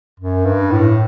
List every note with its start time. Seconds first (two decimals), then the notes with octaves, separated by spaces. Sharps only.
0.20 F#2
0.46 G2
0.72 A2